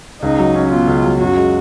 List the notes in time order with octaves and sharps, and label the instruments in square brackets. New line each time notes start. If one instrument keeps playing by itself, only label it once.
[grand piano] C#2 [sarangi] D#4
[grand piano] F#3
C#4
[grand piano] B2 [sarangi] F4
[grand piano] C#2
F#3
[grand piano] F#2 [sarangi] F#4
[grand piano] G#3